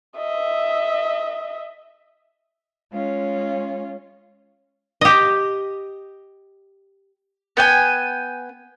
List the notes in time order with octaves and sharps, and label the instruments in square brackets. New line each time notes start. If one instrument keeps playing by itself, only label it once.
[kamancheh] D#5 E5
[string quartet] G#3 C#4 F4
[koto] G4 D#5
[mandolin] B3 G5 G#5